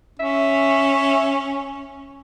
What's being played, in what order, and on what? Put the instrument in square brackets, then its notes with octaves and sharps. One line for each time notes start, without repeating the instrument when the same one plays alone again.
[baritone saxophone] C#4 [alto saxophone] E5